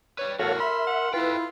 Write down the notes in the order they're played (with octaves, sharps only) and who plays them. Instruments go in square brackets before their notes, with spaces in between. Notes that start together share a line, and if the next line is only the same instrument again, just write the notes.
[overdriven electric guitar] G3 B4 [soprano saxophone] C#5
[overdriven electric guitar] E2 A2 [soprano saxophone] F#4 [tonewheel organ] A4 C#5 F5 [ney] A#4
[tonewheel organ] E5 [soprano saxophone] B5 [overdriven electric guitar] C6
[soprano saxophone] F#5
[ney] E4 [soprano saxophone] F4 [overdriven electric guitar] A4 G5 [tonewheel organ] B4